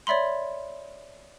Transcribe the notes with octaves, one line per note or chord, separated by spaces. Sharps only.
C#5 D5 E5 B5 C6